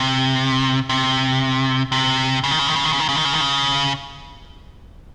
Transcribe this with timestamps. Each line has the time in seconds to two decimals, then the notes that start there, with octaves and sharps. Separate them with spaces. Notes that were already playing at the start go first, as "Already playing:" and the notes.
Already playing: C3
0.89 C3
1.92 C3
2.44 C#3
2.51 D#3
2.59 C#3
2.67 D#3
2.76 C#3
2.84 D#3
2.93 C#3
3.00 D#3
3.09 C#3
3.16 D#3
3.25 C#3
3.33 D#3
3.41 C#3